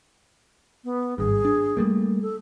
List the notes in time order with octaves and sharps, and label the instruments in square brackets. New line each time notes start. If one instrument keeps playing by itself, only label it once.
[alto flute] B3
[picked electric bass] G#1 G2 [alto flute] G#4
[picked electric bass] D4
G3 A3 A#3
[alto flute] A4